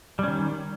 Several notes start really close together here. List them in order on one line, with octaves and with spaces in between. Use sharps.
G3 C#4 D#3